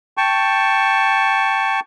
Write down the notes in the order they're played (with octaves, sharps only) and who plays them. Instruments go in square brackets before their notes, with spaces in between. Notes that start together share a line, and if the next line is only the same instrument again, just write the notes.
[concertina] G5 A5 C#6